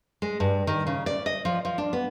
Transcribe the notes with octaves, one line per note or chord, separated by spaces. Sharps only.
G#3
G2
D#3
C#3
D5
D#5
F3
F3
D4
B3